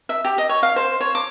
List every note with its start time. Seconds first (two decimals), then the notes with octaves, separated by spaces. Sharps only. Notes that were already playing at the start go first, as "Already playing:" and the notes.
0.09 E5
0.25 G4
0.38 D#5
0.49 C#5
0.63 F5
0.76 C5
1.01 C#5
1.15 D6